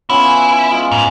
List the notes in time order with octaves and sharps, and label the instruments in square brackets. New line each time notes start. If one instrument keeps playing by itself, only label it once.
[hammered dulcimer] B3 C#4 F4 [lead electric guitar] E4
[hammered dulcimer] G#3 F4 D#5
[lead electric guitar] G#2